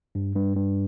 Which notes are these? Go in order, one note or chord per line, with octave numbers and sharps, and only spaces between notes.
G2
G2
G2